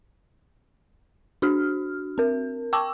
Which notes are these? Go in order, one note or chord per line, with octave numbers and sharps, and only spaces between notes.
D4 F#4 F6
C4 A#4
G5 A5 C#6 D6 E6